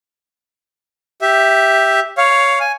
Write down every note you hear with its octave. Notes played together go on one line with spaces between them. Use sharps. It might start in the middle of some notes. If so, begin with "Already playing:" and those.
G4 E5
C#5 F5
G#5